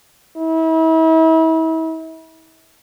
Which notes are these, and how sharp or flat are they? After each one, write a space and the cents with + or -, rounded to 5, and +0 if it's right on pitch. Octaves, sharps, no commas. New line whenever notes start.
E4 -40